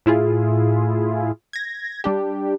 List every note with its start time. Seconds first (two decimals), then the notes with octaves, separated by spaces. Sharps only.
0.06 A2 E4 F4 G#4
1.53 G#6 A#6
2.04 G3 D4 G4